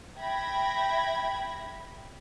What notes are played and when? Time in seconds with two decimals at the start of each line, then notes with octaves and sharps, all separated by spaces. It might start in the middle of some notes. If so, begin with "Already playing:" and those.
0.18 E5 G5 B5 G#6 A#6